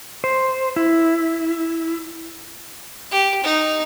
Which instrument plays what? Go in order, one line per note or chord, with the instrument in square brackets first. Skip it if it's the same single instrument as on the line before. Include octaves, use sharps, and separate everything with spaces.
[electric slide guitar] C5
E4
[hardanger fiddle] G4
D#4